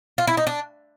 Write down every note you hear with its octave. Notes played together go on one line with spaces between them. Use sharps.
F4
E4
D#4
D4